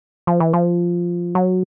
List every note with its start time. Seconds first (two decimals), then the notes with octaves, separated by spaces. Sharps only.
0.27 F3
0.40 E3
0.53 F3
1.35 F#3